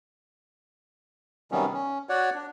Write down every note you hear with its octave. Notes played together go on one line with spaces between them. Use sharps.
C3 D#3 F#3 G3 B3 C#4
C#4
F#4 C#5 D5 F#5
D4